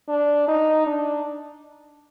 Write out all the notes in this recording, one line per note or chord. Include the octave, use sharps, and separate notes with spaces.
D4
D#4
D4